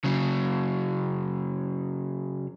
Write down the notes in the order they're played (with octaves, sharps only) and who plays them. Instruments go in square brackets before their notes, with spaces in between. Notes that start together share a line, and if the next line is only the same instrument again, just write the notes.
[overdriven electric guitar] C#3 F#3